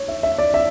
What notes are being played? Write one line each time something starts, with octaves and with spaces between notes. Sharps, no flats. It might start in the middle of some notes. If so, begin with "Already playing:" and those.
Already playing: C#5
E5
E5
D5
E5